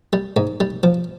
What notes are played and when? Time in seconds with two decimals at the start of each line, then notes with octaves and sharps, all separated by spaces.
0.13 G3
0.37 G#2
0.60 G3
0.83 F3